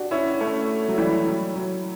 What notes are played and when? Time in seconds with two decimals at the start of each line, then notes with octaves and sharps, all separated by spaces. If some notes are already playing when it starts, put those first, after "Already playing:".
Already playing: D4 F#4 G4
0.11 C#4 E4
0.40 A3 C#4
0.88 F#3
0.98 E3 G3
1.27 F#3
1.55 F#3